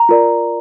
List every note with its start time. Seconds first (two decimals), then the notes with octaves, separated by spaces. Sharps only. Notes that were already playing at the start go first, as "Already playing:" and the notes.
Already playing: A#5
0.09 F4 A#4 D5